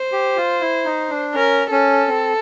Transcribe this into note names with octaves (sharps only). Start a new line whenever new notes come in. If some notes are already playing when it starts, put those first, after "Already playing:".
Already playing: C5
G4
F4
E4
D#4
D4
C#4 A#4
C#4 A4
C4